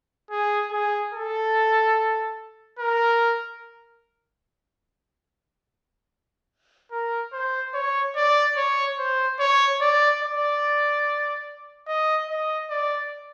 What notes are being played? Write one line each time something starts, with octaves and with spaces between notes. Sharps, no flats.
G#4
G#4
A4
A#4
A#4
C5
C#5
D5
C#5
C5
C#5
D5
D5
D#5
D#5
D5